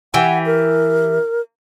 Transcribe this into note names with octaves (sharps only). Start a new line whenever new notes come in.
E3 G4 F#5 G#5
A#4